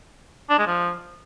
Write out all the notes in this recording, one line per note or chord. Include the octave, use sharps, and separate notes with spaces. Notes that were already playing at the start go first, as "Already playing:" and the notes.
D4
G#3
F3